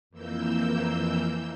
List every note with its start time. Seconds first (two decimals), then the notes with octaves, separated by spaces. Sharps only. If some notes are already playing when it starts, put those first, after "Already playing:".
0.10 F2 E3 A#3 E6 G6